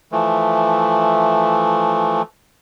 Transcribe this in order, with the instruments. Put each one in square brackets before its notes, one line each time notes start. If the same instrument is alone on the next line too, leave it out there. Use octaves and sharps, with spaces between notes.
[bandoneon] E3 F3 A3